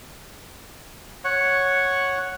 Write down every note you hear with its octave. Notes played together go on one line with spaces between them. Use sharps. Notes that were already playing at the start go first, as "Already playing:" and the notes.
C#5 F#5 C#6